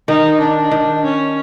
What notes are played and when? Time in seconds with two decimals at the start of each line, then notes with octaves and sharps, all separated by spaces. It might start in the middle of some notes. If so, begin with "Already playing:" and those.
0.08 D#3 D#4
0.40 D4
0.71 D#3
1.04 C#4